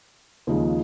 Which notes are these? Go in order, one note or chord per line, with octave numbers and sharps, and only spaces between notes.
D#2 C#3 F3 G#3 D#4